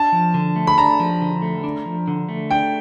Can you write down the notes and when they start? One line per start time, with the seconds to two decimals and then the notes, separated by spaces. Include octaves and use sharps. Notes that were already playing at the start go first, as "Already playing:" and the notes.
Already playing: D4 A5
0.12 F3
0.34 D3
0.56 A3
0.67 B5
0.78 D4 A#5
1.00 F3
1.21 D3
1.42 A3
1.64 D4
1.85 F3
2.08 D3
2.29 A3
2.51 D4 G5